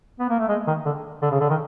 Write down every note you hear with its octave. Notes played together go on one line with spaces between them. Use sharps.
B3
A#3
A3
G#3
D#3
D3
D3
C#3
D3
D#3